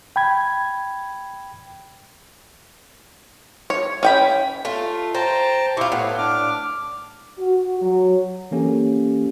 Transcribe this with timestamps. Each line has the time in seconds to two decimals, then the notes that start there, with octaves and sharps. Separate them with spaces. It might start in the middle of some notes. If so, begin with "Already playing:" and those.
0.16 G5 B5 G#6
3.70 C#5
4.03 C#4 G5 B5
4.65 A3 F4
5.15 C5 G5 A5 A#5
5.77 C4 E4 F4 G4 C#6
5.92 A2 B3 F#5
6.18 D4 D6 F6
7.39 F#4
7.82 F#3
8.51 E3 A#3 C#4 G4 A4